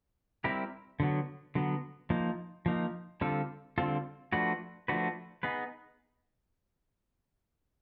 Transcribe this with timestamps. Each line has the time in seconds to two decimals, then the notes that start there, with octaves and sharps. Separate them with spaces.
0.44 G3 C4 E4 G4 A#4
1.00 D3 F#3 B3
1.55 D3 F#3 B3
2.10 F3 A#3 D#4
2.66 F3 A#3 D#4
3.21 D3 G3 C4 F4 A4
3.78 D3 G3 C4 F4 A4
4.32 F3 A3 D4 F#4 B4
4.88 F3 A3 D4 F#4 B4
5.43 B3 D#4 G#4 B4